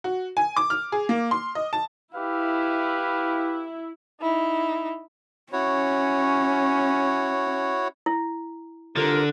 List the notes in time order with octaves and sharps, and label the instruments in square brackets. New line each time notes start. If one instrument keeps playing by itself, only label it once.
[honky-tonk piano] F#4
G#5
D6
F6
G#4
A#3
C6
D#5
A5
[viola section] E4 [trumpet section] G4 B4 F5
[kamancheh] D#4 E4
[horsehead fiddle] C#4 [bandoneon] E4 F#4 C#5
[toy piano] E4
[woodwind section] C2 F4 A#4 [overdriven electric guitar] D3